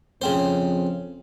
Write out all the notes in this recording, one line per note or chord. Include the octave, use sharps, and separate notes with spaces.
F2 C#3 C4 C5